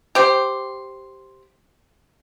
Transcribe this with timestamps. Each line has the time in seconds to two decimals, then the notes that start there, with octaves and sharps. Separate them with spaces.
0.15 G4 C5